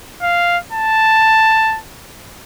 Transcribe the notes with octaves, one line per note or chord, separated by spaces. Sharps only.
F5
A5